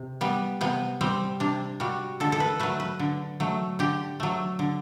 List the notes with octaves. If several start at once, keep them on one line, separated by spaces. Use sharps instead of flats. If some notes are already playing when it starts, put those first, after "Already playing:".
Already playing: C3
G3 B3
C3 B3
G3 C4
C3 D4
G3 F#4
D3 A4
A4
B4
F#3 A3 B4
B4
D3
F#3 A3
D3 G4
F#3 A3
D3